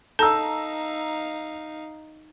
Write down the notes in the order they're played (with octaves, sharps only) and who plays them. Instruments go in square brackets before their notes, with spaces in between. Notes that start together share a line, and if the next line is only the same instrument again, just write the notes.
[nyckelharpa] D#4 F5 [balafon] A4 [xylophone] A5 [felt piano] A#5 E6